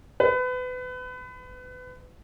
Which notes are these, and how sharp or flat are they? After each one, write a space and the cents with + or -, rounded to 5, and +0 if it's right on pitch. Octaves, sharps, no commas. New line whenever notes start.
B4 +30